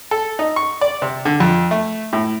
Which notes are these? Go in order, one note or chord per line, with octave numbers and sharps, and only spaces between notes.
A4
D#4
C#6
D5
C3
D3
F2
A3
A2